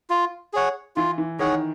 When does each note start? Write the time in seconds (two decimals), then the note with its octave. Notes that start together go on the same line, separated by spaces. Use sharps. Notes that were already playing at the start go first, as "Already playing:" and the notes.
0.10 F4
0.53 G#4 C#5 F#5
0.96 E3 F4
1.18 E3
1.39 D#3 G#4 C#5 F#5